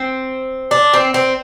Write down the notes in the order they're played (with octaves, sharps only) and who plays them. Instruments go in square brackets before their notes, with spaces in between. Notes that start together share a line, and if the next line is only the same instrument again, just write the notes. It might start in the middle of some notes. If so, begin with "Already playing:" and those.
Already playing: [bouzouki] C4
D4
C4
C4